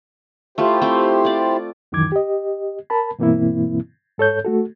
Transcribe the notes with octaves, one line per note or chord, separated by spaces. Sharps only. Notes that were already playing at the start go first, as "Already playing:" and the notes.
A3 E4 F4 G4 C5
A3 C4 G5
F4 D5
C#2 F#2 D#3 E3 D6 G#6
G4 D#5
A#4 A5 B5
G2 B2 E3 A#3 C4 E4
G#2 A4 C#5 G6
A3 F#4 A4